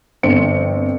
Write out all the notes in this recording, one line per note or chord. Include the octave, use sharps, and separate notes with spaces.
G1 C4 C#7